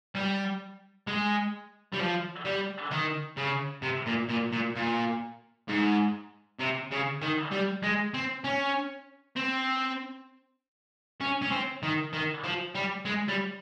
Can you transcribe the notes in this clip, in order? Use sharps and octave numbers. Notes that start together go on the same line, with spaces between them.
G3
G#3
G3
F3
G3
D#3
C#3
C3
A#2
A#2
A#2
A#2
G#2
C3
C#3
D#3
G3
G#3
C4
C#4
C4
C#4
C#4
C4
D#3
D#3
F3
G3
G#3
G3